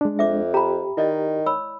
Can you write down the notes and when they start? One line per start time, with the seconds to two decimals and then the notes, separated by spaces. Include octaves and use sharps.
0.01 G#3 D4
0.19 F2 E5 D6
0.54 G4 A#5 B5
0.97 D#3 E4 D5 D#5
1.46 C#5 B5 E6